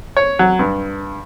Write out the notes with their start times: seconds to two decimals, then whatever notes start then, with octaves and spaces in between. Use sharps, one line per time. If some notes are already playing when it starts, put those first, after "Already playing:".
0.17 C#5
0.39 F#3
0.59 G2